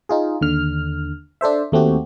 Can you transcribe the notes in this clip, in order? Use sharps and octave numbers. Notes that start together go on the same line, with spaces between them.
D#4 F4 G#4
D#2 D3 F6
D4 A4 C5 E5
D#2 A3 C4 F#4 G4